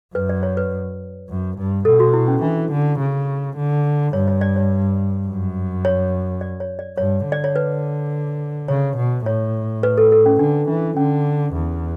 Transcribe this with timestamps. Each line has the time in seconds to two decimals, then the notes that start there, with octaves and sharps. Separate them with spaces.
0.15 F#2 B4
0.29 D5
0.43 C#5
0.57 B4
1.29 F#2
1.58 G2
1.85 B2 A4
2.00 F#4
2.13 E4
2.28 C#4
2.42 E3 D4
2.71 D3
2.99 C#3
3.57 D3
4.13 G2 C#5
4.28 C#5
4.41 D5
4.56 C#5
5.27 F#2
5.85 C#5
6.41 D5
6.60 C#5
6.79 D5
6.97 G2 C#5
7.26 D3
7.32 D5
7.44 C#5
7.56 B4
8.68 C#3 C#5
8.97 B2
9.26 A2 C#5
9.83 B4
9.98 A4
10.12 A4
10.26 C#4
10.39 D3 D4
10.68 E3 D4
10.97 D3 C#4
11.53 E2